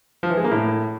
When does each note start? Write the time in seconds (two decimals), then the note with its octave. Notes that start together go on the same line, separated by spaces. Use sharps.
0.23 F3
0.30 E3
0.37 G#3
0.44 A#3
0.51 A2